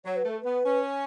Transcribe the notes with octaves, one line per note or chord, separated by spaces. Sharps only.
F#3 C#5
B4
A3 A4
B3 B4
C#4